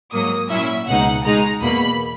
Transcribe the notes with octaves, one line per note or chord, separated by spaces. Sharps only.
G#2 F#3 A#3 D#6
A#2 F#3 C#4 E4 E5
C#2 B2 G#3 D#4 F#5
B2 G#3 D#4 A#5
E2 B2 A#3 B5